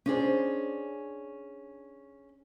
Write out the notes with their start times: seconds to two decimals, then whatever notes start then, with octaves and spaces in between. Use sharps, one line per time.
0.06 C#4 D4 G#4 C5